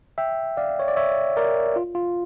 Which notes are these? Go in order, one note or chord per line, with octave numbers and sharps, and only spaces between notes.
E5 G5
D5 F5
C#5
D5
C#5 E5
A#4 D5
F4
F4